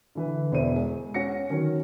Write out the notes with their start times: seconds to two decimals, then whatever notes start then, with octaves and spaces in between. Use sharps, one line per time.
0.15 D3 E3 B4
0.52 E1 C5 D5 E5 D#7
0.76 G#3
1.14 C#4 F#5 A#6 C#7
1.50 D#3 F#3 C#4 A#4